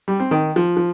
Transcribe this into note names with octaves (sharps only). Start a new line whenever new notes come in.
G3
C4
D#3
F3
F3